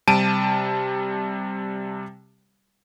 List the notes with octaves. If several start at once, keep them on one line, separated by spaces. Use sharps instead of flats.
C3 G3 A5 D7 D#7